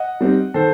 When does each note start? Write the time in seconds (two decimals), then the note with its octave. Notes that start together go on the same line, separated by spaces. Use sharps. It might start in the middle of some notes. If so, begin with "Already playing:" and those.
Already playing: D#5 F#5
0.21 G3 C4 D#4
0.54 D#3 A4 C5